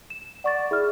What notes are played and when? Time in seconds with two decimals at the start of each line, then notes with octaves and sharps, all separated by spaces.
0.10 E7
0.44 D5 F#5 C#6 A6
0.71 E4 G#4 F6